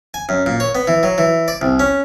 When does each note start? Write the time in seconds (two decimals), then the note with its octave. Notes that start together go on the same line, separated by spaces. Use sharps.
0.14 G#5
0.29 F#2
0.46 A#2
0.60 C#5
0.75 B3
0.87 E3
1.03 F#3
1.18 E3
1.48 D5
1.61 C2
1.79 C#4